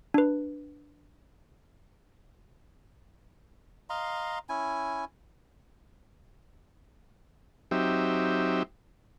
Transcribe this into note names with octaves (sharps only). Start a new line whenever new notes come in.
D4 B4
D#5 F5 A#5 C6
C#4 E4 G#5
F#3 C4 D#4 G4 E5